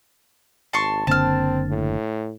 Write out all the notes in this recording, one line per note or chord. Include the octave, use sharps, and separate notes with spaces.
G#1 A5 C6 C#6
F#1 D3 A#3 C4 A5 F6
A2